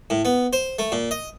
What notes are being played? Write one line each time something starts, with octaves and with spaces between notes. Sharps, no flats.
A2
B3
C5
A3
A#2
D#5